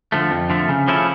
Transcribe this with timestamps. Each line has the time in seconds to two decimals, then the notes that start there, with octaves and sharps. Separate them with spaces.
0.12 D3 F3 A3
0.31 F2
0.50 D3 F3 A3
0.69 C#3
0.88 F3 A3 C#4 E4